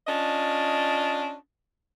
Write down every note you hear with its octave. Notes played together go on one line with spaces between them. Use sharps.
C#4 D4 F4 D#5